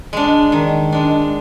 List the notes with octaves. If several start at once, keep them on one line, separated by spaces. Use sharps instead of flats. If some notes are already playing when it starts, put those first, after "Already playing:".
G#3 D4
D#3
G#3 D4